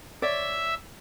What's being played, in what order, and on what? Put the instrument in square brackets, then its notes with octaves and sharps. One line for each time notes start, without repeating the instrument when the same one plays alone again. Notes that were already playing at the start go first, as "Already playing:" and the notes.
[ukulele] C#5 D5 [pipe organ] E5